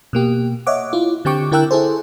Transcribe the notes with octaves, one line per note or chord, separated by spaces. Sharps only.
B2 A#3 G4
C#5 D#5 E5 F#5 D6
E4 F4
D3 C4 G4 G5 C#6 D6
D3 E4 A#4 G5 E6 F#6
E4 G#4 A4 C5